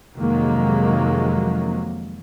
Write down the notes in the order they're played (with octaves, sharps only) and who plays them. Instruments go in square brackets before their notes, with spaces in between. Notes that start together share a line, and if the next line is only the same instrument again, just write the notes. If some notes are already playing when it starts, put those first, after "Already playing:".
[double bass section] F2 C3 D#3 F#3 G#3 A#3